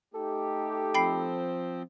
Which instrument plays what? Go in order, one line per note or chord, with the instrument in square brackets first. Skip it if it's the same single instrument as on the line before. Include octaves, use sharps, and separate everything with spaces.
[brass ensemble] A3 D#4 G4 [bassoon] A4
[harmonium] F3 C4 [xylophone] G5 B5 C7